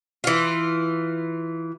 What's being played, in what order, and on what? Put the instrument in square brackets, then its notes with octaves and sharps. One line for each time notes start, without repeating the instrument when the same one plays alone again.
[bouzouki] E3 F4